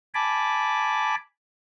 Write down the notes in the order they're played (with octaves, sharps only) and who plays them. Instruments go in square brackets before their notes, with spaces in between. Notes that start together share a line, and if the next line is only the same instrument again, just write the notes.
[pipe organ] G#5 A5 B5 D6